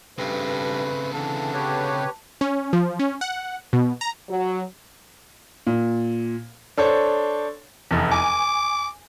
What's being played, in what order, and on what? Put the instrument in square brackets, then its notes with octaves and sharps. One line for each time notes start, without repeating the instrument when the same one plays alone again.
[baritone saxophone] G2 [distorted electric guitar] C#3 C4 [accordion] A3 [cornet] B4
[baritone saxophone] D3 [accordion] E3 [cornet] A5
[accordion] G4 B4 C#5
[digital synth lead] C#4
F3
C#4
F#5
B2
A#5
[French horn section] F#3
[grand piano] A#2
D4 A4 C5 C#5
[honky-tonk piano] F1 E2
[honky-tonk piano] G#5 [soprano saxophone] D6